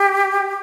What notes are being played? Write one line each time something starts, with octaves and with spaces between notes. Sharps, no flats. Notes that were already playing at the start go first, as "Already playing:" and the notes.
Already playing: G4